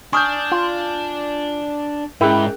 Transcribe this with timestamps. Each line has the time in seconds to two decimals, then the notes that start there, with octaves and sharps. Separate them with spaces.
0.13 D4 G#5 C#6 D#6 F6 G6
0.52 F4
2.21 G#2 C#4 E4 G#4 A#4 G5 F#6